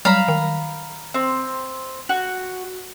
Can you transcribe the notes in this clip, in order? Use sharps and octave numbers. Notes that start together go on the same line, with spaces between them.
F#3 G3 F5 A#5 B5 E7
D#3
C4
F#4